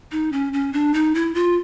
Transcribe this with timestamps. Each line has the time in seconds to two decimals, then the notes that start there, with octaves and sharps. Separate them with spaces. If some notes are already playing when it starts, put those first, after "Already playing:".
0.12 D#4
0.32 C#4
0.53 C#4
0.73 D4
0.94 D#4
1.15 E4
1.35 F4